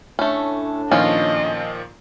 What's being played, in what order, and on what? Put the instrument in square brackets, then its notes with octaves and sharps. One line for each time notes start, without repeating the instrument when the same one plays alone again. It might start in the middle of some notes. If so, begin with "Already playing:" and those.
[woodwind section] A2 D4 [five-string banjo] A3 C#4
[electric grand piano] A#2 D#3 F3 [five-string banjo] C#4 F4 [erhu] D#5